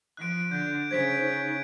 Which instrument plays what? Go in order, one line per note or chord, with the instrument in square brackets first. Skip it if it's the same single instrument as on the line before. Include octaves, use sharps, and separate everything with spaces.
[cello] F3 [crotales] F#6 D7
[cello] D3 [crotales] G6
[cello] C#3 [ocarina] C5 [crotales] G#6 B6 D7
[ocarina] D#4